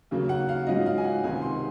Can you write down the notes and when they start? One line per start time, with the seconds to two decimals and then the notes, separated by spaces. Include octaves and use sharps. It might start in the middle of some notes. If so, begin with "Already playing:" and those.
0.11 D#2 C#3 F#3 A#3
0.29 F#5
0.49 F5
0.66 G#2 F#3 C#4 F4 D#5
0.86 F5
0.98 G#5
1.04 F#5
1.24 C#2 C3 D#3 G#5
1.42 C6